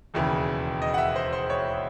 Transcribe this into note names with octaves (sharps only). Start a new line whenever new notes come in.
E1 D#2 C#3 E3
D#5
F#5
E5
C5
C5
C#5